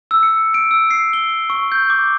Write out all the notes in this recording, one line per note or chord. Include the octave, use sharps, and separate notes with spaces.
E6
C#7
D7
E6
C7
G7
C#6
G6
D6